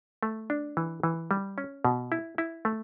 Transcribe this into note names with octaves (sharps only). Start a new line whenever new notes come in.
A3
D4
E3
E3
G3
C#4
B2
E4
E4
A3